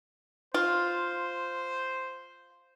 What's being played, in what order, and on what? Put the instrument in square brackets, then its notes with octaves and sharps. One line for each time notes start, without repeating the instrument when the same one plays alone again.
[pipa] F4 [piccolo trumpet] C5